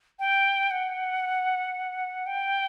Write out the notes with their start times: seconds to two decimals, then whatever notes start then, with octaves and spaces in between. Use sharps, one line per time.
0.19 G5
0.71 F#5
2.26 G5